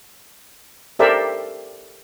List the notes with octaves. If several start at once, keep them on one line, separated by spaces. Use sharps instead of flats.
G4 A4 A#4 C5 D5 E5